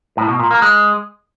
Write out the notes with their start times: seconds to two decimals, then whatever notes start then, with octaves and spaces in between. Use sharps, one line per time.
0.17 A2
0.28 B2
0.39 A#2
0.51 A#3
0.62 G#3